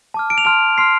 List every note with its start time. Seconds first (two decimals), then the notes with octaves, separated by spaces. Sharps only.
0.14 A5 D6 F6
0.30 D7
0.38 F7
0.45 A5 C6 F6 D7
0.77 A5 C6 F6 C7